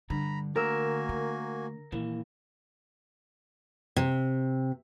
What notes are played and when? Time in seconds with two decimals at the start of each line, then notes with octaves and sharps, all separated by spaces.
0.10 G2 D3 A#5 B5
0.56 D2 A#3 F#4 A#4 G#5 E6
1.09 D3
1.92 D#2 A#2 E3 A#3
3.97 C3